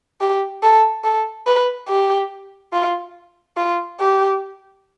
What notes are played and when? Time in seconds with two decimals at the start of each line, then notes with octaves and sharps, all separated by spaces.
0.21 G4
0.63 A4
1.04 A4
1.47 B4
1.88 G4
2.73 F4
3.57 F4
4.00 G4